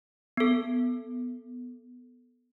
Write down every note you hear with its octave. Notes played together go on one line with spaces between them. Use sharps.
B3 A4